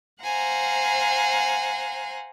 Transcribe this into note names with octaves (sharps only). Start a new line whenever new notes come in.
C5 F5 F#5 G#5 A#5